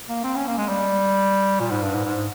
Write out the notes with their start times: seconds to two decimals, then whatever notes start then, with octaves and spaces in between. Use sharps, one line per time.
0.09 A#3
0.24 C4
0.36 C#4
0.48 A#3
0.58 G#3
0.69 G3
1.60 A#2
1.71 G#2
1.83 G2
1.95 G#2
2.05 G#2